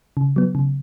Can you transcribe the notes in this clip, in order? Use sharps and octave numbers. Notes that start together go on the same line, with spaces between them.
C#3
F#3 B3
C#3